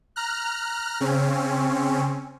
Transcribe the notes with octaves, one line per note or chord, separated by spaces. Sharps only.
A#5 F6 F#6
C#3 C4 C#4